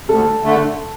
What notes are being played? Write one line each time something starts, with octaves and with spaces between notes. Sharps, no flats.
D2 A4
D3 A3